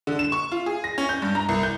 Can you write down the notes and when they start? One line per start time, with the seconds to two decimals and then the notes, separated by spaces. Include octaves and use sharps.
0.07 D3
0.19 E7
0.32 C#6
0.52 F4
0.66 G#4
0.84 A#6
0.98 C#4
1.09 G6
1.22 G2
1.35 A#5
1.49 C2
1.63 G6